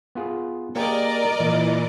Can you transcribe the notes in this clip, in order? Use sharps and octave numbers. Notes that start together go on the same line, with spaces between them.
B3 F4 G#4
A#3 G4 G#4 A#4 D5 D#5
A#2 E3